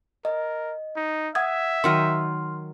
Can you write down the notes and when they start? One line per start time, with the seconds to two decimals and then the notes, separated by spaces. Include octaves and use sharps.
0.25 A#4 D#5
0.96 D#4
1.35 E5 F#5 D#6 G#6
1.84 D#3 F#3 D#5 C6 F6